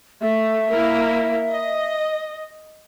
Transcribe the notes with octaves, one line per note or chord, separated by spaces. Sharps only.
A3 E5
A#3 E4 A#4
D#5